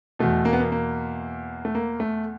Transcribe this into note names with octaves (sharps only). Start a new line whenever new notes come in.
E2 B2 A3
A#3
B3
A#3
A#3
A3
A#3
A3